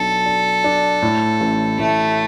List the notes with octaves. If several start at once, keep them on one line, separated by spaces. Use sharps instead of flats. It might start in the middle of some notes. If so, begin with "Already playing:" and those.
Already playing: B1 D4 A4
D4
D4
A2
A1
A2 A3